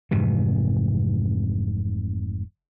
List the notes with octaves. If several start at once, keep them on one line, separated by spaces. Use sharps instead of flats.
F1 G#2 C3 E3